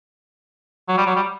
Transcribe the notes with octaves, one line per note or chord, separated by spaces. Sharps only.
F#3
G3
F#3
G3